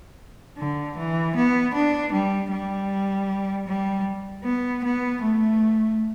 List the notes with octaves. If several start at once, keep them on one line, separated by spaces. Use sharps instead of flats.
D3
E3
B3
D4
G3
G3
G3
B3
B3
A3